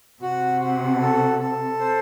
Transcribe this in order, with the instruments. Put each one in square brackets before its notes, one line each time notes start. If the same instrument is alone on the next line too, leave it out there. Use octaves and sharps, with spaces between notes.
[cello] C3 [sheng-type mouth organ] F#4
[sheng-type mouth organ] F#4
A4
A4
C5